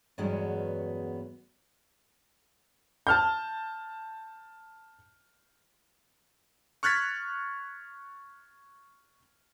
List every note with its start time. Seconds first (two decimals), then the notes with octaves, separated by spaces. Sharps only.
0.18 E2 G2 F#3 G#3 B3 C#4
3.07 A5 F6 G6
6.83 C#6 F6 F#6 G#6 A6 B6